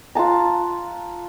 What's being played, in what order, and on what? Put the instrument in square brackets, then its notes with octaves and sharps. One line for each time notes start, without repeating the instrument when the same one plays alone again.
[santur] F4 F#5 A5 A#5